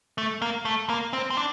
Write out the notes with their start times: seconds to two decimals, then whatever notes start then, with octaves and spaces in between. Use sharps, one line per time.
0.18 A3
0.42 A#3
0.65 A3
0.90 A#3
1.13 C4
1.30 C4
1.37 D4